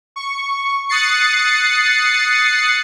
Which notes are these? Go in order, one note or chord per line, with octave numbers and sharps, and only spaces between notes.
C#6
D#6 F#6 A6 C7 C#7